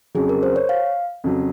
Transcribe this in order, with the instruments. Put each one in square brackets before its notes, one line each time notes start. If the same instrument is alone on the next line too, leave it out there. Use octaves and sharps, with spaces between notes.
[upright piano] F2 C#3 F#3 [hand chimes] G#4
[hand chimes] A#4
C5
C#5
F5
[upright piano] F2 C#3 F#3